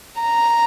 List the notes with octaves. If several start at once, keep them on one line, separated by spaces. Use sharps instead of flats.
A#5